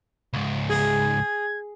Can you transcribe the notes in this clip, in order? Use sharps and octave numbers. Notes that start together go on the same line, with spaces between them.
C#2 G#2
G#4 G#6